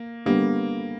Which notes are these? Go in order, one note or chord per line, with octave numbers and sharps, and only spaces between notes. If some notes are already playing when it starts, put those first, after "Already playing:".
Already playing: A#3
D3 G3 A#3 B3